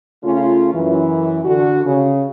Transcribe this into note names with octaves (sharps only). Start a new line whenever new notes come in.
C#3 A3 C#4 F4
F#2 E3
D3 F#4
C#3